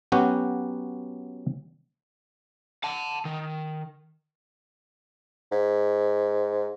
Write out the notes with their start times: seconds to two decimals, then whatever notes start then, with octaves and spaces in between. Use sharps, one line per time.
0.12 F#3 B3 C#4 F#4 G4
2.84 F#5 A5
3.25 D#3
5.52 G#2